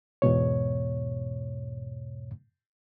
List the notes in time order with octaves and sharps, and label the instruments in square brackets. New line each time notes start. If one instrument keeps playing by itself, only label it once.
[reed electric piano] E2 G#2 B2 C#5